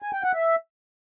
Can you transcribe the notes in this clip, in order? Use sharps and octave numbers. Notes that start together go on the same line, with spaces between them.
G#5
G5
F#5
E5